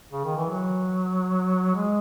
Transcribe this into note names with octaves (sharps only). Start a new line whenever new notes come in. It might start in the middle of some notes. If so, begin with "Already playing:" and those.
C#3
D#3
E3
F#3
G#3